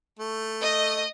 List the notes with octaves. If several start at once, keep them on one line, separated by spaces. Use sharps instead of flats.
A3
D#5